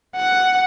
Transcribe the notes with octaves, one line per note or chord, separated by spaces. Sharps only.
F#5